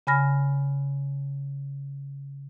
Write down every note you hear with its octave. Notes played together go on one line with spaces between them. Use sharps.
C#3 G#5 B5 F6 A#6